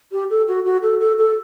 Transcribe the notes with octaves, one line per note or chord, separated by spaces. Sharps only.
G4
A4
F#4
F#4
A4
A4
A4